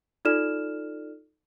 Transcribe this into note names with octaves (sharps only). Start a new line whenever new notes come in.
D#4 F4 A4 D5 F6 E7